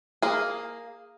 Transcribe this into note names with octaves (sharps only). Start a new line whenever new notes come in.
A#3 G#4